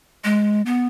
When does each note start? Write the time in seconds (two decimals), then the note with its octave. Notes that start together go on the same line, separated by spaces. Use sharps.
0.24 G#3
0.66 B3